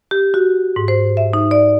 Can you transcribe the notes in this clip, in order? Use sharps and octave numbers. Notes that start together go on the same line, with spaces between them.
G4
F#4
G#2
C5
E5
D#4
D5